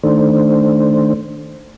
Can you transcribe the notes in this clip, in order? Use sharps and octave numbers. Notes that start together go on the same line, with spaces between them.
D#3 A3 D4 C5